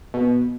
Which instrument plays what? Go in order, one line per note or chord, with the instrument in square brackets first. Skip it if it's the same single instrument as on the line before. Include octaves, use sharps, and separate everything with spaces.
[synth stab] B2